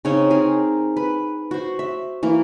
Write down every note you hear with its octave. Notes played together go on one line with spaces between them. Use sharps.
C#3 C4 D#4 C#5
C4 G#4 A#4
B4
F#4 C5
E5
E3 A#3